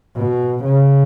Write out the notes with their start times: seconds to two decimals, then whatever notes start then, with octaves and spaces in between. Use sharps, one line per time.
0.17 B2
0.64 C#3